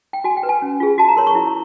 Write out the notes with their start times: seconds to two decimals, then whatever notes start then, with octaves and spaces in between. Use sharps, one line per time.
0.13 G5
0.24 F#4 G#5
0.37 G5
0.43 B4
0.49 G#5
0.62 C#4
0.80 F4 G#4
0.98 F#4 A5
1.08 A#5
1.17 A#4 C#5 C6
1.27 C#6
1.35 E4